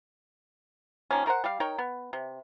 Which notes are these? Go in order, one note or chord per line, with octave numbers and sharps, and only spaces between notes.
D#3 F3 A#3 C#4
A3 A#4 C5 F#5
G3 G4 F5
D#4 A#4 C#5 G5
B3
C3